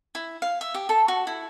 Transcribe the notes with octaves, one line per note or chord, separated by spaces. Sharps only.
E4
F5
E5
G4
A4
F#4
E4